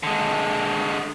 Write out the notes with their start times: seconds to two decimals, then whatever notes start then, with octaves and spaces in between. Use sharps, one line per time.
0.03 D3 G#3